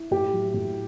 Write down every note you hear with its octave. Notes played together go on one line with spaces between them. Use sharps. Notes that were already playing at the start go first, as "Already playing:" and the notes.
Already playing: E4
A2 G4
F#3
A2